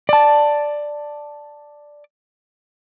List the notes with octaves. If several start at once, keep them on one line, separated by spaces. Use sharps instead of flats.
D5 A5